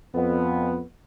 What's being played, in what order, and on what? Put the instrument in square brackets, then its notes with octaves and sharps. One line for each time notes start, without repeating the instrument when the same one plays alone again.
[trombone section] F2 B3